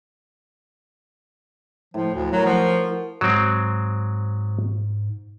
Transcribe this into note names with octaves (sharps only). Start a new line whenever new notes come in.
A2 F3
D2
F#3 F4 F#4 A#4
F3
G#2 F#3 G#3 C4